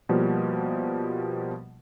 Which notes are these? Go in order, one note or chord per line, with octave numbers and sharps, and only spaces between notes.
B2 F3 G3 A#3